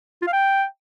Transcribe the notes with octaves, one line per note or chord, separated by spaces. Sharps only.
F4
F5
G5